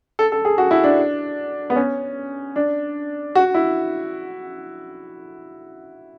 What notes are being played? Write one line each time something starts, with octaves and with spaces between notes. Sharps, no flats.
A4
A4
G#4
F#4
E4
D4
B3
C#4
D4
F#4
E4